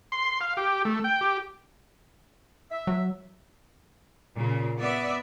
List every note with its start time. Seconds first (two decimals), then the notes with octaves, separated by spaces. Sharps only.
0.12 C6
0.41 F5
0.57 G4
0.85 A3
1.04 G5
1.21 G4
2.71 E5
2.87 F#3
4.36 A#2 C#3
4.78 B3 D5 E5